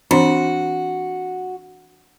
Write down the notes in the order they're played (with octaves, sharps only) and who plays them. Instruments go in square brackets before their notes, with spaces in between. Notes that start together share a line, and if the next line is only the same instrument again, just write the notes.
[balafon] E3 C4 D4 [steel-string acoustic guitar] F#4